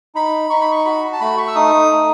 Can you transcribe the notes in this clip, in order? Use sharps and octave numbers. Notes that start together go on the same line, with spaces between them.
D#4 B5
D#4 C#6
B5
C#6
F#4 B5
A5
A3 B5
C#6
E6
D#4 D#6
A3